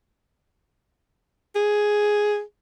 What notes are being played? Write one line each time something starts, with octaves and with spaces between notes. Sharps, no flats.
G#4